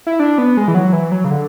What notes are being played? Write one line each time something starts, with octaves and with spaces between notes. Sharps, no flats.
E4
D4
B3
G#3
E3
F#3
E3
F#3
C#3
D3